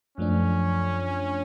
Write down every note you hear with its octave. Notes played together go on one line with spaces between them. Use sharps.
F#2 F3 A3 C#4 D4